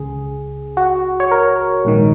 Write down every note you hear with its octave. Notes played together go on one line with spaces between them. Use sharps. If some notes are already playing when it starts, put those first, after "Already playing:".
Already playing: C#2 C#3 G#4
F#4
C#5
A#4
A#1 G#2 D#3